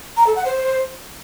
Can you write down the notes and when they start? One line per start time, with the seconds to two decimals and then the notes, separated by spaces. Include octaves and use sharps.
0.17 A#5
0.26 A4
0.36 F#5
0.45 C5